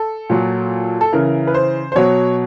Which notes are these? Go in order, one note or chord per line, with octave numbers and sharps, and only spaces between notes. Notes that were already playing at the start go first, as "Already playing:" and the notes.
Already playing: A4
A#2 F#3
A4
C#3 E3 A#4
B4
C5
C5
B2 F#3 C#5